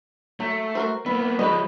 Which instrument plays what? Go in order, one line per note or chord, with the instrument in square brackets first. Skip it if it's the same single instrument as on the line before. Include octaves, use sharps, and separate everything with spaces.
[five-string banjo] F#3 [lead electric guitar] A3
[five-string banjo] F#4 A#4 C5
[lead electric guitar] A#3 B3 [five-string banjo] E4
[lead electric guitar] F3 G#3 [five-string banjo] B4 C#5 D#5